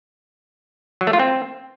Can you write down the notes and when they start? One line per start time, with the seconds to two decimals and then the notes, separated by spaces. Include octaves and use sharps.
1.01 F#3
1.07 A3
1.13 F4
1.19 C4